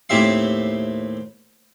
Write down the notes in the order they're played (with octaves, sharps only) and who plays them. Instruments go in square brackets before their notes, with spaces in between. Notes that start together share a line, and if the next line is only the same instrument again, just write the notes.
[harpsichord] D#2 A2 C4 G4 E5 C6